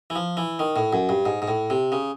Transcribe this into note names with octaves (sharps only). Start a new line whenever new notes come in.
E3
F3
E3
D#3
A2
F#2
G2
G#2
G#2
A2
C3
C#3